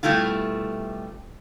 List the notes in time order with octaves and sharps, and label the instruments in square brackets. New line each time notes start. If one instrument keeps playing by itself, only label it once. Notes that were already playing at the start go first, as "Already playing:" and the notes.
[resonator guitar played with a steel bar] B2 G3 A3 E4 F4